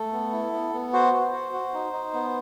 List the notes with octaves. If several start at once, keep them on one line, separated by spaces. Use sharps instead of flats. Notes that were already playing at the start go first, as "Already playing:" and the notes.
Already playing: A3 A4
B3
E4
B3
B3
F#4 C5
F#4
F#4
F#4
D#4
D#4
B3